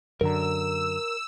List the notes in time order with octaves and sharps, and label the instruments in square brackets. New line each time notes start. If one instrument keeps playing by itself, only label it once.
[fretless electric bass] F#2 D3 [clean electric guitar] A#4 A#5 [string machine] E6